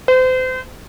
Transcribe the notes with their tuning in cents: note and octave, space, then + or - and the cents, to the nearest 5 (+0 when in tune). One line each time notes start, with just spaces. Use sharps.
C5 -35